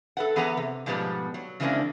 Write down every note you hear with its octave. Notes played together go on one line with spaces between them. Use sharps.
A4 B4 F#5
E3 B3 G#4 B4 F#5 A#5
C3
G#2 B2 F3 G3 B3
F#3
C#3 E3 G#3 A#3 C4 D4